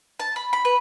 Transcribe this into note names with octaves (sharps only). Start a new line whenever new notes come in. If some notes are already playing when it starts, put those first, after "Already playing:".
A5
B5
B5
B4